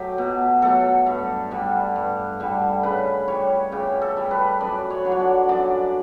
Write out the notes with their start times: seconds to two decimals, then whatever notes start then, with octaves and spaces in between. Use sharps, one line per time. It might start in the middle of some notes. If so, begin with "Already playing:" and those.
Already playing: F#3 A3 G4
0.18 B2
0.62 F#3 A3 A4
1.07 G2
1.51 D3 G3
1.96 G2
2.40 D3 G3
2.83 C#3 B4
3.28 G3 C#5
3.72 C#3 G4
4.01 A4
4.17 G3
4.31 B4
4.61 F#2 D5
4.90 C#5
5.05 D3 F#3
5.12 C#5
5.20 D5
5.49 F#2 D5